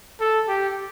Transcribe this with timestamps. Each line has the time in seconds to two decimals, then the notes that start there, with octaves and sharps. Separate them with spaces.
0.21 A4
0.48 G4